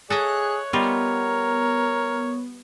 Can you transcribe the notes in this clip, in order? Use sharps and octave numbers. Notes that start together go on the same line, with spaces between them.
G#4 A4 C#5 D#5 E5 F#6
G3 B3 D#4 F4 A#4